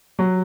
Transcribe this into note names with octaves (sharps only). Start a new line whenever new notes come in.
F#3